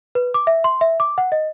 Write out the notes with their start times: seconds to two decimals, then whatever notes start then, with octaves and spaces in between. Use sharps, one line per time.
0.15 B4
0.34 D6
0.47 E5
0.64 C6
0.81 E5
1.00 D6
1.18 F#5
1.32 D#5